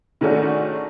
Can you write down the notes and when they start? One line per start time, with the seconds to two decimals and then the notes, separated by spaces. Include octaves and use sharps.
0.21 D#3 G#3 A3 C#4 D4 F#4